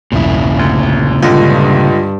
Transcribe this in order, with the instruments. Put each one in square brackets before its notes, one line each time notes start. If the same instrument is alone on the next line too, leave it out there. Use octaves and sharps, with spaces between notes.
[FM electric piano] B1 E2 G2 [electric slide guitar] A#2 C#3 E4
[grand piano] D2
[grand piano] C#2 D3 [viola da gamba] G2 [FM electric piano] F4